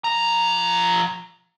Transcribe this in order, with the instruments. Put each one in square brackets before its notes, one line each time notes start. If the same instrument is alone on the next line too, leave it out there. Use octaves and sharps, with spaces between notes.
[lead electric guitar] F3 A#5